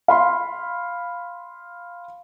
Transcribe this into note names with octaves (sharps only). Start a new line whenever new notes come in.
F5 B5 C6